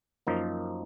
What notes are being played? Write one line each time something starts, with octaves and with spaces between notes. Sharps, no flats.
F#2 F3 A#3 D#4